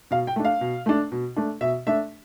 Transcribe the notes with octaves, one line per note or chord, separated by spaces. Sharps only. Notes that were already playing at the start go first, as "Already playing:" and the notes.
B2 F5
G5
A3 D4
F5
B2
A3 D4
B2
A3 D4
B2 E5
A3 D4 E5